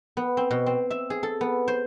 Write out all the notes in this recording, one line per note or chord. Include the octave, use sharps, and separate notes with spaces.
B3
C4
B2
C4
E5
G#4
A4
B3
C5